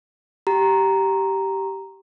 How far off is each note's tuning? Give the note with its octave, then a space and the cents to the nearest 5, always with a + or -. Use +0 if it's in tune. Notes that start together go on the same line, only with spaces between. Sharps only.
G4 -10 A#5 +0